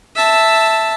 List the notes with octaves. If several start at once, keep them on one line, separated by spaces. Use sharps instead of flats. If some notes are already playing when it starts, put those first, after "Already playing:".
E5 A5